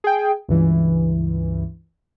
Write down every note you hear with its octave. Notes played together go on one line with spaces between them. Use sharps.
G#4 G5
C#2 G2 E3